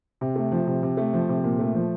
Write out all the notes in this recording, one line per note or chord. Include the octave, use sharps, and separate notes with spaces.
C3
A3
F3
C3
C3
A3
F3
C3
A#2
A3
F3